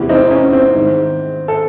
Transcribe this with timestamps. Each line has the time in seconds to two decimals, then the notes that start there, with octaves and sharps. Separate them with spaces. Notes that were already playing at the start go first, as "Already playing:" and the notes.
Already playing: E2 C3 E3
0.09 C4 D#4
0.21 D#4
0.31 C#4
0.53 C4
0.74 G#2 D#3
1.48 A4